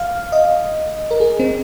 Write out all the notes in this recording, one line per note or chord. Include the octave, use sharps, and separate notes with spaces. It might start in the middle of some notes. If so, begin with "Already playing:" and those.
Already playing: F5
D#5
A#4
G#4
C4